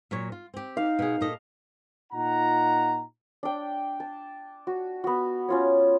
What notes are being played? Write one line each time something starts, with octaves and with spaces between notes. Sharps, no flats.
A#2 F#3 C#5
F4
C4 G4
D#4 F5
B2 G#4
A#2 A4 D#5
A#2 D#4 F4 F#5 A#5
D4 G5
A5
F#4
B3 F#4
C#4 F4 C#5